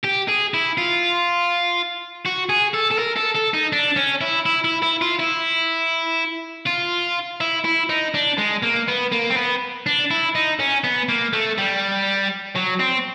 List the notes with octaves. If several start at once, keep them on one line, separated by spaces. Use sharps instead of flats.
G4
G#4
E4
F4
F#4
G#4
A4
A4
A#4
A4
A4
D#4
D4
C#4
E4
E4
E4
E4
F4
E4
F4
E4
E4
D#4
D4
G#3
A#3
B3
A#3
C4
B3
D4
E4
D#4
C#4
B3
A#3
A3
G3
F#3
C4